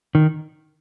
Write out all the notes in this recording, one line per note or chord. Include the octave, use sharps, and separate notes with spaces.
D#3